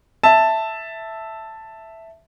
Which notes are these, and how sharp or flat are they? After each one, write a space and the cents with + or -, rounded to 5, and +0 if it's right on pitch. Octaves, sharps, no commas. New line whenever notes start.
E5 +0 A5 +5